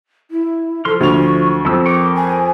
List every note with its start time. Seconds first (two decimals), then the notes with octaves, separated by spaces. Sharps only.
0.31 E4
0.85 F3 A4 C6 F6
1.00 D2 C#6 F7
1.65 F2 F3 E6
1.86 A#4 G5 C#6 D6
2.15 G#5